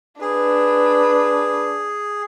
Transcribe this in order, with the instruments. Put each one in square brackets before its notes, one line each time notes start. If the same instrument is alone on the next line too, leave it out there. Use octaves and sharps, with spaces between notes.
[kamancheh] D4 B4 [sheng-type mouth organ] G#4